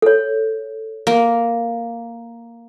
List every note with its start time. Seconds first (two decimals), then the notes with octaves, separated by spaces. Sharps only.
0.02 A4 C#5
1.07 A#3